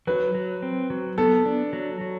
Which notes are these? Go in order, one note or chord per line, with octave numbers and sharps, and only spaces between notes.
F#3 B4
F#3
C4
F#3
B3 A4
D4
F#3
F#3